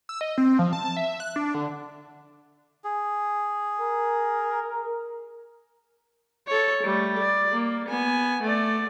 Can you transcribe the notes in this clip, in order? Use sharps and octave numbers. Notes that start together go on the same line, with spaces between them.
E6
D#5
C4
F3
A5
A5
E5
F#6
D4
D3
G#4
A#4
A4 C#5
G3 A3
D5
A#3
B3 G#5
A3 D5